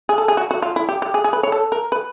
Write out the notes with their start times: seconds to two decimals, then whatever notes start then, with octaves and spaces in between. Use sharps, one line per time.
0.09 G#4
0.18 A4
0.28 G#4
0.37 F#4
0.51 F#4
0.62 F4
0.76 E4
0.89 G4
1.02 G4
1.14 G#4
1.24 G#4
1.33 B4
1.43 C#5
1.52 A4
1.72 A#4
1.92 B4